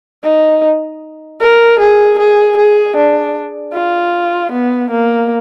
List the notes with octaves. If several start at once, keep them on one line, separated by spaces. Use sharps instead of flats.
D#4
A#4
G#4
G#4
G#4
D4
F4
B3
A#3